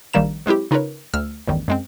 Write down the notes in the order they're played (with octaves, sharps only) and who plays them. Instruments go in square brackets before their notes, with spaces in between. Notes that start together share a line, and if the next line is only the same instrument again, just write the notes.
[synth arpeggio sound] A#1 D#3 G3 A#3 A#5 E7
F#3 G#3 C4 E4 G4
C#3 D#4 F4 A#4 B4 C#5
D2 E6 F6
A1 E2 G2 D#3
F#2 G#3 C4